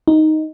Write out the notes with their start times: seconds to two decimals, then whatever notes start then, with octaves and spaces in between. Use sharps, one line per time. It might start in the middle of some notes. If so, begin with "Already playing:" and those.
0.08 D#4